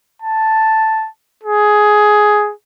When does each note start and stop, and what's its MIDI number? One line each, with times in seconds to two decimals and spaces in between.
0.22 1.09 81
1.44 2.53 68